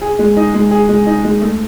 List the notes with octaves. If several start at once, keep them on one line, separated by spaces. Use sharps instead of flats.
G#4
G#3
D#4
G#3
G#4
G#3
D#4
G#3
A3